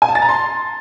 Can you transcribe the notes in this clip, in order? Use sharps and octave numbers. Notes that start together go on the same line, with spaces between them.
G#5
A5
A6
A#5
C6